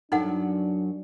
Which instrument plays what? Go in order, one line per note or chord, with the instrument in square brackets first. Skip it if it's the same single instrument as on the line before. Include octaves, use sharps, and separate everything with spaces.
[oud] F#2 F#3 [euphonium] D4 [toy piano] D#4 A4 F#5